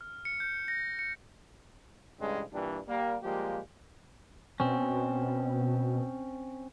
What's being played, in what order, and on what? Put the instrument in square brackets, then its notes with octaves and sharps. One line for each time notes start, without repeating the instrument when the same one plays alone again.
[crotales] F6
C#7
G6
A#6
C#7
[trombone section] A1 G2 C#3 G3 G#3
G2 A#2 E3 G3 D4
G3 A#3
F3 G3 G#3 A#3 G4
[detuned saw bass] B2 [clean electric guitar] C4 C#4